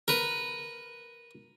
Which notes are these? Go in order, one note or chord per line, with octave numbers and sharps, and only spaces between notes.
A#4 B4